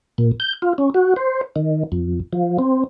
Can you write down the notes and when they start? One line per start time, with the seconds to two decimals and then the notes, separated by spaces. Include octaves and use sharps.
0.18 A#2
0.40 G6
0.62 F4
0.78 C#4
0.94 F#4
1.16 C5
1.56 D#3
1.92 F2
2.33 F3
2.59 C4